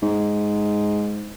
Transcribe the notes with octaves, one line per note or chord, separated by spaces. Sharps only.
G#2